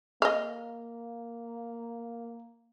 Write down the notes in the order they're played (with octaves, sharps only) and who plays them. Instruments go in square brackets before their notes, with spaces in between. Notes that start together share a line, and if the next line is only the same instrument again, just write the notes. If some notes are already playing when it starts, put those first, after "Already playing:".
[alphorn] A#3 [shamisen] D#5 F5